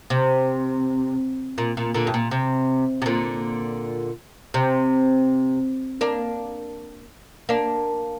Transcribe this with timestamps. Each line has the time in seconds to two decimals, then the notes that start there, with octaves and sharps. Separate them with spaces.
0.10 C3
1.58 A#2
1.77 A#2
1.94 A#2 D3
2.07 G2
2.14 A#2
2.31 C3
3.02 C3
3.06 A#2 D3
4.54 C3
6.01 A#3 D4
7.49 A#3 D4